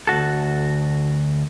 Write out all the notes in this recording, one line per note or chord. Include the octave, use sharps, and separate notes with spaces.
D2 A#2 F#4 A4